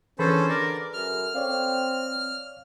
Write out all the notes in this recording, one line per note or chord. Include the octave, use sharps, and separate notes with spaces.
D3 E3 C#4 G#4 A4 B4 C5 B5
A4 A#4 D5
F#2 F6
C4 C#5 D5 F5